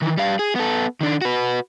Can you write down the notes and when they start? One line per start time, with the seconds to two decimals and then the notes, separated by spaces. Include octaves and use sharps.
0.02 D#3 E3
0.18 G3 F5
0.39 G#4
0.56 B3 A4
1.01 D#3 D4
1.21 F#4 B4